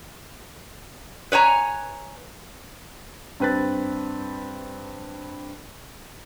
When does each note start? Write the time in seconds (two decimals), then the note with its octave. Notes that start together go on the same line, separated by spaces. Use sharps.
1.32 B4 C#5 G#5 A#5
3.40 G2 C4 B4 F#6 A6